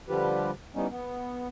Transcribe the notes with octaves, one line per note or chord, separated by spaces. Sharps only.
D3 F3 G3 F4 G4 B4
E3 G3 B3 C#4 D#4
B3